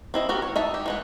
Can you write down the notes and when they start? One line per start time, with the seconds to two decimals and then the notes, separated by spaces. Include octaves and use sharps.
0.14 C4 E4 D#5
0.29 A3 F#4 G4 A#4
0.42 C#5
0.56 D#4 E5 A5
0.74 G4
0.86 E3 G#3 F#5